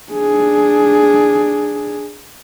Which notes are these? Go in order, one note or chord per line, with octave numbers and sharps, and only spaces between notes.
D4 G#4